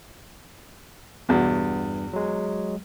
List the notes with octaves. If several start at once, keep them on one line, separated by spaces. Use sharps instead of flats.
E2 G2 B2
F#3 G#3